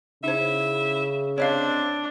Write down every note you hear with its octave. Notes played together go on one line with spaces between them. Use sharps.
C#3 D#4 E4 C5 E5
C3 C4 D4 C#5 D#5 F5